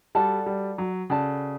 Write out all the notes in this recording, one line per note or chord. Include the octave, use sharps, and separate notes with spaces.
G3 F#4 A4 D5 A5
G3
F#3
C#3 F#4 A4 D5 A5